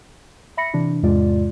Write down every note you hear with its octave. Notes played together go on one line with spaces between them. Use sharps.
E5 B5 A#6 C#7
C3 E3 D4
E2 G#2 C3 G#3 F4 D5